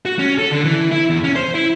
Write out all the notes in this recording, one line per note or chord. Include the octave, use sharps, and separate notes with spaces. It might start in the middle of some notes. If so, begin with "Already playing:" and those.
F#4
C#4
A4
D3
E3
E4
E2
C#4
C5
E4